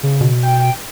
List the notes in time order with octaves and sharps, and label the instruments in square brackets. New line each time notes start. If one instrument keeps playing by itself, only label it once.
[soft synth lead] C#3
[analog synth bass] B2
[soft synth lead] G5